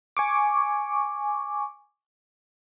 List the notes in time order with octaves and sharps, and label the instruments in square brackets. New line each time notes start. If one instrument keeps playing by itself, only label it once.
[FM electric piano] G#5 C#6 D6